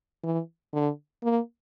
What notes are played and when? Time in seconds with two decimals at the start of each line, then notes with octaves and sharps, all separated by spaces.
0.24 E3
0.74 D3
1.24 A#3